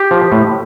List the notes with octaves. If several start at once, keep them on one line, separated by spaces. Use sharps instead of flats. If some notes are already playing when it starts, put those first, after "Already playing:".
Already playing: G4
F3
A2